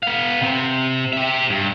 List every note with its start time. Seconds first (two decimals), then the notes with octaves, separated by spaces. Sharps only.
0.03 B3 F5
0.41 C3 C4
1.13 G4 E5
1.50 G2